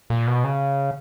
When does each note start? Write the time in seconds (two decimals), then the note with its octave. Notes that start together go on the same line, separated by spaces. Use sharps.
0.10 A#2
0.27 B2
0.44 C#3